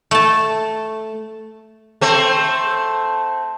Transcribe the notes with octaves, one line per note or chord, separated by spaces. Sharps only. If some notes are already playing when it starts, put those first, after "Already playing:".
A3 A5
A3 C4